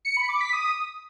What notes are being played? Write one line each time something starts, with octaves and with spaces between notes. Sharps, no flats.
C#7
B5
D6
B6
D#6